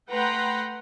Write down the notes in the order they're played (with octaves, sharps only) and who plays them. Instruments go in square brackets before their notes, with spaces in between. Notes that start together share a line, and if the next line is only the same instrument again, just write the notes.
[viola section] A3 B4 F#5 G5 A#5 C6